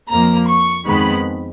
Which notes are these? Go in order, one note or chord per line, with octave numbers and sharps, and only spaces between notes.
F2 F3 A#3 A#5
C#6
F2 D#3 G#3 B3 B5